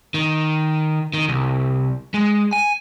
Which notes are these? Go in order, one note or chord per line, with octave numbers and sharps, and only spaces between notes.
D#3
D#3
C2
G#3
G#5